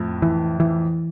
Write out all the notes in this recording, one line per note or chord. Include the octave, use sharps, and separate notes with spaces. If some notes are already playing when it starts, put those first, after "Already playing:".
Already playing: F2 A2
E3
E3